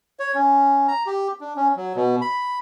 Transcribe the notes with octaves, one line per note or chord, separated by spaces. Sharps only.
C#5
C#4
A#5
G4
D4
C#4
F#3
B2
B5